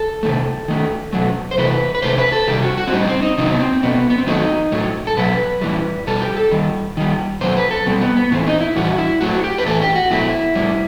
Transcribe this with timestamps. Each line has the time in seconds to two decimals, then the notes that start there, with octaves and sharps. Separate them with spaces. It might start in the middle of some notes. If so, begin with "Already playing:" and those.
Already playing: A4
0.23 C3 D#3 A3
0.68 D#3 A3
1.13 B2 F#3 A3
1.51 C5
1.58 C3 E3 A3 B4
1.95 B4
2.02 C3 D#3 A3 C5
2.18 B4
2.32 A4
2.47 C3 D#3 G3 G4
2.62 F#4
2.78 F#4
2.87 C4
2.92 A2 G3 D#4
3.07 C4
3.22 D#4
3.37 C3 D#3 F#3 D#4
3.53 B3
3.60 C4
3.83 B2 A3 B3
4.10 B3
4.18 C4
4.27 D#3 F#3 A3 D#4
4.72 A2 F#3 A3
5.07 A4
5.17 B2 F#3 A3 B4
5.61 A2 E3 G3
6.07 B2 G3 A4
6.22 G4
6.37 A4
6.51 D#3 G3
6.97 D#3 G3
7.41 B2 F#3 A3 C5
7.57 B4
7.71 A4
7.86 B2 G3 C4
8.01 B3
8.17 B3
8.31 A2 E3 A3 C4
8.47 D#4
8.60 E4
8.76 A2 E3 G3 F#4
8.98 E4
9.21 A2 F#3 A3 F#4
9.35 F#4
9.44 G4
9.58 B4
9.65 A2 E3 A3 A4
9.81 G4
9.96 F#4
10.11 B2 F#3 A3 E4
10.55 A2 G3